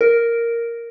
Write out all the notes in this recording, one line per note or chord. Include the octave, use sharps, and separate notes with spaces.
A#4